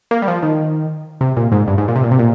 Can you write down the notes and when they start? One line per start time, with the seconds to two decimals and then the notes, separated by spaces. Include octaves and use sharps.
0.11 A#3
0.22 G3
0.28 F3
0.43 D#3
1.21 C3
1.37 A#2
1.52 G#2
1.68 G2
1.78 G#2
1.88 A#2
1.96 C3
2.04 A#2
2.11 C3
2.19 A#2